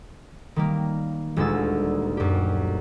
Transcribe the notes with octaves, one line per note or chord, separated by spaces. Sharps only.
D#3 G3 A#3
D#1 D2 A#2 G#3 E6 A6
F#2 G4